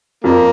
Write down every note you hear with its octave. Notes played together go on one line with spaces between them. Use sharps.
F2 A#3